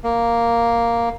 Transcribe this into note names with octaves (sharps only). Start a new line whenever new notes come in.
A#3